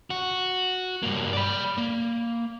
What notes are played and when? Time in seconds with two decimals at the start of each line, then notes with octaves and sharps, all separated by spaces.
0.10 F#4
1.03 G2 A#3
1.33 D5 B5
1.78 A#3